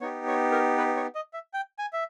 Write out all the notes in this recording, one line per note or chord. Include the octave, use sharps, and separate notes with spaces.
B3 D#4 G4 C#5
C#5
A#4
B4
C#5
D#5
E5
G5
G#5
E5